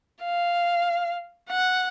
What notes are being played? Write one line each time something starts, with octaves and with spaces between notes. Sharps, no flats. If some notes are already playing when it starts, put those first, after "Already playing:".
F5
F#5